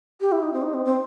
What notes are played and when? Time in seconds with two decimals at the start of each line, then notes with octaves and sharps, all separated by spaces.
0.21 G4
0.32 E4
0.42 D#4
0.53 C4
0.63 D#4
0.74 C4
0.85 C4